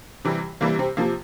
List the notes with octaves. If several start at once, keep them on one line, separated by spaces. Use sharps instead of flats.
C3 E3 G3
C3 E3 G3 A#3
C3 C4
C3 F3 A#3